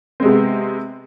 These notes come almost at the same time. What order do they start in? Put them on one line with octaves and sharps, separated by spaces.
C4 G#3 C3 B3